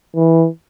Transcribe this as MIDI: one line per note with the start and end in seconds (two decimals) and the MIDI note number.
0.16 0.47 52